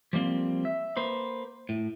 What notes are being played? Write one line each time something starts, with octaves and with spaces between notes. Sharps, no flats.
F3 G3 A#3 C4
E5
A#3 B4 C5
A2